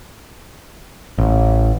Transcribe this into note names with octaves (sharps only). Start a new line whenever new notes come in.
A1